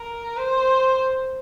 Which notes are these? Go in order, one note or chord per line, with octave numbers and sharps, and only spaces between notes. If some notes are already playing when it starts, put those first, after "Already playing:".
Already playing: A#4
C5